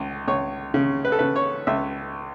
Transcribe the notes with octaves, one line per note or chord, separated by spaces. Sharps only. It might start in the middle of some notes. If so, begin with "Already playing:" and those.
Already playing: C#2
C#2 C#5
C#3
B4
A4
C#3 B4
C#5
C#2 E5